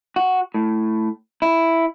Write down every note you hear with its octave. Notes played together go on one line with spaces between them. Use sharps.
F#4
A2
E4